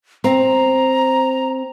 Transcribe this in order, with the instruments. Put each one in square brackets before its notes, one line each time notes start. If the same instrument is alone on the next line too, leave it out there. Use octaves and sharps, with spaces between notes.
[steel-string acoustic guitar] C4 [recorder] A#5